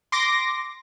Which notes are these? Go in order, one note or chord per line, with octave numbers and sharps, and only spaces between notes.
C6 D6 A#6